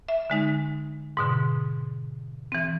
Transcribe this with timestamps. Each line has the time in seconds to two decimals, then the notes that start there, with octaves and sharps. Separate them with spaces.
0.08 E5
0.30 D3 G#3 D#4
1.17 G#2 B2 D3
2.52 E3 C4